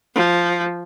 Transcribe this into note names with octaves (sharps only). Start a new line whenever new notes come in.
F3